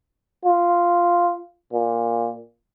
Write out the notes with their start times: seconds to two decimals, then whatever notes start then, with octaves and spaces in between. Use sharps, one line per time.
0.45 F4
1.73 A#2